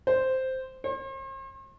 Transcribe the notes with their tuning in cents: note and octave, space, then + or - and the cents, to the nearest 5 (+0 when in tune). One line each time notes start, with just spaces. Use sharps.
C5 -5
C5 +45